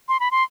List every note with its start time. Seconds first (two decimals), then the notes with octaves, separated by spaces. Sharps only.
0.09 C6
0.20 B5
0.31 C6